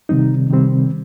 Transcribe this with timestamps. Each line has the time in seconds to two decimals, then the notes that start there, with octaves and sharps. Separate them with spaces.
0.09 C3 D#3 G3 C4 D#4
0.50 C3 D#3 G3 C4